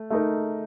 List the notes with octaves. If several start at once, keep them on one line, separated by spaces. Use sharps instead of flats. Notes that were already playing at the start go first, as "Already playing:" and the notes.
Already playing: A3
A3 D#4 A#4